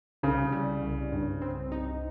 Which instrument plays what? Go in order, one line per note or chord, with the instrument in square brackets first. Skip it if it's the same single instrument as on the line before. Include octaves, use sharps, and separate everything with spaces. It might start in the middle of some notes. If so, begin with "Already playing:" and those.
[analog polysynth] C2 [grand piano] C#3
[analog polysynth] G3
C2
G2
C4
D#4